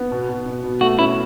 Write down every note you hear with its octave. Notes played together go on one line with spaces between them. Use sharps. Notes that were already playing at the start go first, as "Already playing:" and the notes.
Already playing: B3
B2
B2
B2
B2
A3 F#4
C#4 E4